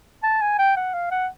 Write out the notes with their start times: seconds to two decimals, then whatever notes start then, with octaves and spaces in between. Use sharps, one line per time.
0.23 A5
0.41 G#5
0.58 G5
0.76 F#5
0.94 F5
1.11 F#5